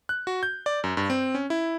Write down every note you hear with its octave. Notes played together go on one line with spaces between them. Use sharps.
F#6
F#4
G6
D5
F#2
G2
C4
C#4
E4